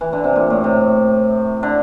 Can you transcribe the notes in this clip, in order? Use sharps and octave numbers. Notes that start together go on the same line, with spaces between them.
E3
D3
C3
A#2
A2
C3
D3